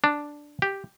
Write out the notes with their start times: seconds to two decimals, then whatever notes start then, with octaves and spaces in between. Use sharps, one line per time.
0.04 D4
0.62 G4